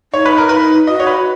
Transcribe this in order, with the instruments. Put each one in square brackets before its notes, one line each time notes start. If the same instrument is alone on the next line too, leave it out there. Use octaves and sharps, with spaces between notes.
[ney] D#4 [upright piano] C#5
[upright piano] B4
A#4
[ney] D#4 [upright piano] B4
[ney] F#4 [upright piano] D#5
[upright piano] C#5
B4